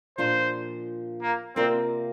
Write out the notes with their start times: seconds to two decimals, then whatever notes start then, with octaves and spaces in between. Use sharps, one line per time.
0.18 A#2 F3 D4 F4 C5
1.22 A#3
1.56 C3 A#3 C4 F4 A#4 D5